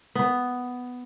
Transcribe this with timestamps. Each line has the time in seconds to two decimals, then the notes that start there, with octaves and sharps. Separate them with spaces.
0.15 B3